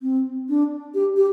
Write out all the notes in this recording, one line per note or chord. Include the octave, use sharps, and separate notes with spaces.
C4
D4
G4
G4